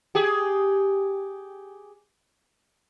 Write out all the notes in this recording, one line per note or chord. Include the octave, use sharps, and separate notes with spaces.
G4 G#4